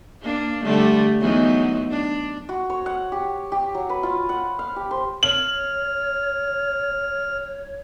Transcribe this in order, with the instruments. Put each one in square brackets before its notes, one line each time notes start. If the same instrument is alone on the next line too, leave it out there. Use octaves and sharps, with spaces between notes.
[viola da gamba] A#3 D4
D3 G3 A3
E2 F#3 D#4
D4
[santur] F#4
C#5
F#5
G4
G4
F#3
B4
F4
F#5
F5
G4
C5
[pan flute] C#5 [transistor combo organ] F6 [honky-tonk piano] F#7